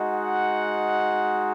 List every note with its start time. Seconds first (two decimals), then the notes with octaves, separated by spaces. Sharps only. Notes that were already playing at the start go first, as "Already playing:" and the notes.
Already playing: G#3 D#4 F#4
0.14 F#5